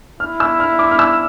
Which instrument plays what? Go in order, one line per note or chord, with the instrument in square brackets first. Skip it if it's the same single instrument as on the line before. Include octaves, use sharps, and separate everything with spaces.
[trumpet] E4 [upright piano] F6
[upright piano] E6
F6
D6
F6
E6